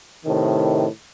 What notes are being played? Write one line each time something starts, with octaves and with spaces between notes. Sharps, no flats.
A2 C3 D#3